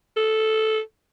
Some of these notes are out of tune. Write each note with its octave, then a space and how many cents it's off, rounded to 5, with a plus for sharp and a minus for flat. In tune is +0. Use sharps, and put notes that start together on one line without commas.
A4 -5